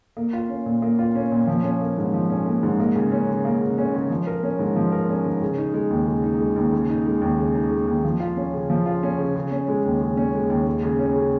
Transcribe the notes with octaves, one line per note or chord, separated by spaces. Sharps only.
A#3
F4
C#4
A#2
A#3
F4
C#4
A#2
F3
C#4
A#3
G#2
F3
C#4
A#3
G#2
A#3
C#3
C#4
C#3
A#3
C#3
C#4
C#3
F3
A#4
C#4
G#2
F3
A#4
C#4
G#2
C#3
D#4
G#3
D#2
C#3
D#4
G#3
D#2
C#3
D#4
G#3
D#2
C#3
D#4
G#3
D#2
F3
F4
C#4
C#3
F3
F4
C#4
C#3
C#3
C#4
G#3
D#2
C#3
C#4
G#3
D#2
G#3
C#3
C#4
C#3